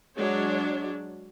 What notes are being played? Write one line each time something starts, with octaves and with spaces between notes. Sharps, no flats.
F#3 G#3 D4 C#5